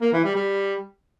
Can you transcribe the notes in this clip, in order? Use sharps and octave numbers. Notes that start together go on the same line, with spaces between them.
A#3
E3
G3
G3